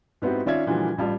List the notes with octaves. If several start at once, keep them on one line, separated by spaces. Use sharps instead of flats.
G#2 B3 C4 E4 F#4 G4
D#3 C#4 F4 D5 E5 G#6
A#2 D3 E3 F3 G3 F#4
A1 G3 F4 A5